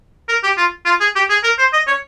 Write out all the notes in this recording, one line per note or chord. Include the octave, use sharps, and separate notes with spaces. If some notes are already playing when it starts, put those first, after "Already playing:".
A#4
G4
F4
F4
G#4
G4
G#4
A#4
C5
D#5
C#5